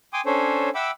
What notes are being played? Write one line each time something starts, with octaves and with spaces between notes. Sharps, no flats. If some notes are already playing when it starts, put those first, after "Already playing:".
G5 G#5 C6 D6 D#6
C#4 D4 A4 C5 C#5
E5 F#5 G5 B5 D6 E6